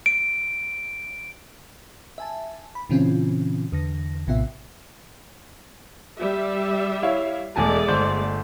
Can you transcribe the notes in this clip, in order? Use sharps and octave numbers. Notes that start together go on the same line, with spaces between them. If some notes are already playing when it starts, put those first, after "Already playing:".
D7
E5 G#5 A5
B5
A#2 C#3 E3 C4 C#4 F4
E2 D3 A#6
A#1 A2 C3 B3 F4 E5
G3 E5
E4 C#5 F5
E1 G#3 A3 D5 G#5 A5
G1 C5 G6